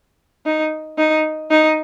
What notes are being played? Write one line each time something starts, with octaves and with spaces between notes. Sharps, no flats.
D#4
D#4
D#4